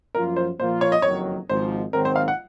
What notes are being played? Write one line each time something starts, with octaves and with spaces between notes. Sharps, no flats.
F#2 F3 A#3 F4 A#4
C5
A#2 F3 A#3 F4 C5
C#5
D#5
F#1 F2 D#3 F#3 C#5
G#1 G#2 F3 C5
G#2 D#3 F#3 C4 A#4
C5
F5
F#5